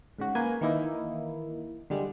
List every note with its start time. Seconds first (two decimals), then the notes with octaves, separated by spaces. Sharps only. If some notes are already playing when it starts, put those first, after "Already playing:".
0.19 G#2 C#3 F#4
0.35 A#3 B4 G#5
0.61 D#3 E3 A#3 D#4 E4
1.90 D3 G3 G#3